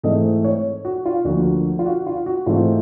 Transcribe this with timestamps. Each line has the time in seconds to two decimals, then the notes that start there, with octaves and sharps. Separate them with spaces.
0.03 G#2 E3 A3 C4 D#5
0.44 C#5
0.85 F#4
1.06 F4
1.25 D2 D3 F3 A#3 F#4
1.79 F4
1.86 F#4
2.07 F4
2.26 F#4
2.46 G#2 E3 A3 C4 F4